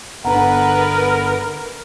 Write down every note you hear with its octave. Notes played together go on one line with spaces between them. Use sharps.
G1 D3 B3 A#4 B4 F#5 A#5